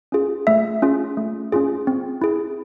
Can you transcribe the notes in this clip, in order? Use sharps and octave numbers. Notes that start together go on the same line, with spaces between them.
C#4 F4 G#4
A3 E5
C#4 F4 G#4
A3
C#4 F4 G#4
C4
E4 G#4